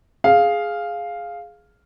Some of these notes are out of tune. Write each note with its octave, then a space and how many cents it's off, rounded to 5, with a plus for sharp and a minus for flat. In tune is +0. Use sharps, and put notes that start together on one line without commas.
G#4 +5 F5 +0